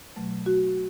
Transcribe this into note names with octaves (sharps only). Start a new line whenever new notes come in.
B2 F#3 A3
F#4